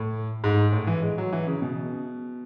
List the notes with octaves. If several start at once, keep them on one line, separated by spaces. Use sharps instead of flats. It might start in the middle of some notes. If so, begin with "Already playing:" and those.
Already playing: A2
G#2
A2
E3
G#3
F#3
E3
C#3
B2